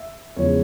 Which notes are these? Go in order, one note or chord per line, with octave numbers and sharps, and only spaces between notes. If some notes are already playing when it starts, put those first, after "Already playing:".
Already playing: E5
E2 C#3 F3 G#3 C#5